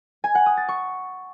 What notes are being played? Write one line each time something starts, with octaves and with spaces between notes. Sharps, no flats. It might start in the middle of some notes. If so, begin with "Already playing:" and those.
G#5
F#5
D#6
A6
C#6